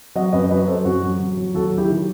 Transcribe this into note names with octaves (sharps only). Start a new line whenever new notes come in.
F#3 D#5 F#5
F#2 B4 D#5
F#3 B4 D#5
F#3 A4 C5
F#2 F#4
F#3
F#3
F#3
D#2 F#4 A4
F#3
E4 G4
D#3